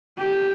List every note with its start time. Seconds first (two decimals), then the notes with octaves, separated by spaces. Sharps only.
0.19 G4